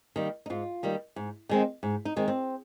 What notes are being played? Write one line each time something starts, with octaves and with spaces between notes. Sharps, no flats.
D#3 G3 A#3
D#4
G#2 F4
D#3 G3 A#3
G#2
D#3 G#3 C4
G#2
D#4
D#3 G#3 C4
C4